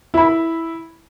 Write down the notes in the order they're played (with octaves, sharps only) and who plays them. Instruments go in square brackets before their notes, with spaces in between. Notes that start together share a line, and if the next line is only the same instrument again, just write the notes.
[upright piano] E4 B5